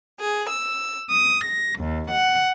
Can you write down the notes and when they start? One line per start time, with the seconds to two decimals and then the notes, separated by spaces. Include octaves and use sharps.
0.20 G#4
0.50 E6
1.10 D#6
1.44 A#6
1.79 D#2
2.09 F#5